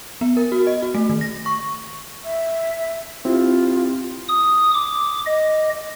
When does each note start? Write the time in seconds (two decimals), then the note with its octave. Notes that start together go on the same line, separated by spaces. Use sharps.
0.21 B3
0.37 A#4
0.52 F#4
0.67 D#5
0.82 F#4
0.95 A3
1.10 D#3
1.21 A#6
1.46 C#6
2.25 E5
3.25 C4 E4 F4 G4
4.29 D#6
4.74 D6
5.26 D#5